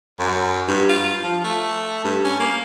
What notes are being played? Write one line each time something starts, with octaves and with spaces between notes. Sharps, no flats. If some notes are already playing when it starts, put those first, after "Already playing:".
F#2
G2
F4
F3
A3
G2
C#4
A#3